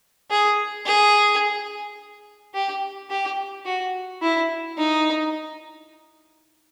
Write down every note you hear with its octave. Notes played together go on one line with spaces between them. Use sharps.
G#4
G#4
G4
G4
F#4
E4
D#4